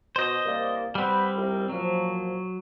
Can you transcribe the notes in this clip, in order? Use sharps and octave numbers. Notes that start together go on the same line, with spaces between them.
B2 C5 D#5
C2 A#3 D5
G3 C4 B4 F#5 B5
C2 F2 A#4
A#2 F3 F#3